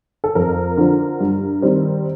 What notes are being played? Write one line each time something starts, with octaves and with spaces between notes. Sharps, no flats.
A4
F2 A#4
D3 F3
G2
D#3 G3 C4